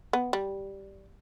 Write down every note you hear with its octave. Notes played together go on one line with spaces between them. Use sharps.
B3
G3